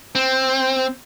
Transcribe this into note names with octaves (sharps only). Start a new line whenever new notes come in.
C4